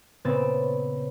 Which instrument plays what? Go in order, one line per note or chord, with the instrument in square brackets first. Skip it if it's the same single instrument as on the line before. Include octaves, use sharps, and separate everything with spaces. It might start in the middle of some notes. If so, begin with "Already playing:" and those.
[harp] A#2 C#3 B3 C4 A6